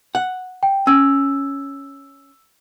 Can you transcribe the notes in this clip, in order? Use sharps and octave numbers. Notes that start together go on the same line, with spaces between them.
F#5
G5
C#4 E6